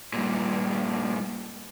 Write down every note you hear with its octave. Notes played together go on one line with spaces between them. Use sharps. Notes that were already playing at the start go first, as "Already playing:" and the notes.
G2 A#2